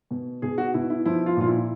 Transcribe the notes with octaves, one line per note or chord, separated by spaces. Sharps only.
B2
B2 G#4
F#4
B2 E4
E4
F3 E4
F4
A#2 F4
E4